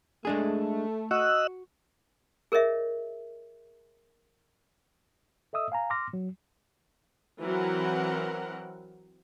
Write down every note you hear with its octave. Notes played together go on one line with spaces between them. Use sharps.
G#3 A3 D4 G#4
F#4 D#5 E6 F#6
G#4 A#4 C#5 D#5 E5
A4 D#5 E5 D#6 E6
F5 G#5 A#5
C6 D6 F6 A#6
F#3
E3 F#3 C4 A#4 F#5